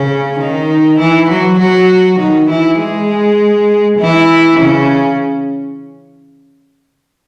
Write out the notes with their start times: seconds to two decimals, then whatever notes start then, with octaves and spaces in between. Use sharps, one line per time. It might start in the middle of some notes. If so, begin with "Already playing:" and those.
Already playing: C#3 C#4
0.39 D#3 D#4
0.99 E3 E4
1.29 F#3 F#4
1.59 F#3 F#4
2.19 D#3 D#4
2.49 E3 E4
2.79 G#3 G#4
3.99 E3 E4
4.59 C#3 C#4